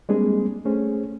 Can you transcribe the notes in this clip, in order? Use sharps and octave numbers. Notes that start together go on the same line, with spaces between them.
G3 G#3 A#3 C4 D4 G#4
A3 C#4 G#4 C5